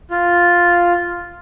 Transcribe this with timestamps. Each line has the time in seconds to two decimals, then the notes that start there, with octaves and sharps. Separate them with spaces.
0.11 F4